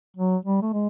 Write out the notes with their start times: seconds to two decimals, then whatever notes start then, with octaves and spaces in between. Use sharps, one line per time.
0.16 F#3
0.45 G3
0.62 A3
0.73 G#3